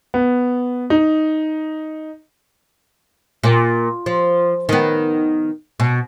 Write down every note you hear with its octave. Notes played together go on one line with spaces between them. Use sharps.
B3
D#4
A#2
F3
D#3 B3
B2